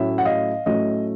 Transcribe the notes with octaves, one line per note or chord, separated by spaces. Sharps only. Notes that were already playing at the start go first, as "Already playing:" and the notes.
Already playing: A2 F#3 A3 C#4 E5
F#5
D#5 F5
A2 F#3 A3 C#4 D#5